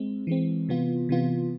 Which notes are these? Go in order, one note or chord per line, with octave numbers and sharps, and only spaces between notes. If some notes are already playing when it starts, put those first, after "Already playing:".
Already playing: G#3 C4
E3 G#3 C4
C3 E3 B3 F4
C3 E3 B3 F4